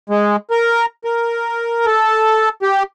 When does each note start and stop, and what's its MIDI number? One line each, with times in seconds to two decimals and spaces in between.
0.10 0.36 56
0.51 0.86 70
1.05 1.86 70
1.86 2.49 69
2.62 2.83 67